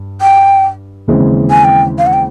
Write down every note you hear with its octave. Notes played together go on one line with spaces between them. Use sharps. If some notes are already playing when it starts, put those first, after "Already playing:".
Already playing: G2
G5
D#2 C#3 E3 G#3 C4
G#5
G5
F5
F#5
G5